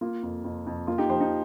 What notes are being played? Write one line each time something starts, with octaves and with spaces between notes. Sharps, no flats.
A#3 F4
F2
F2
F2
A#3 F4
D#4 G4
F3 G4 C5
D#4